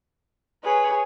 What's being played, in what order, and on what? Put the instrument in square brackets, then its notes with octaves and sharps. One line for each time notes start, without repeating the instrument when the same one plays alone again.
[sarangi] G#4 [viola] B4 C#5